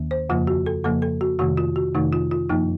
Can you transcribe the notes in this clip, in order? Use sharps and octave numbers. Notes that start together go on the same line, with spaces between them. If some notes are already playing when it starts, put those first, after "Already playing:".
Already playing: D#2 D#3 A#3
C5
F2 C#3 F3 A#3 F4
F#4
A4
F2 C#3 F3 A#3 A4
A4
F#4
F2 C3 D#3 A3 F#4
F4
F#4
F2 C3 D#3 A3 D#4
F4
F4
F#2 F3 A#3 D#4